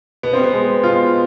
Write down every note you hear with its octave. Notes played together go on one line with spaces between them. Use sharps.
B2 B3
C4
B3
G#3
B2 F4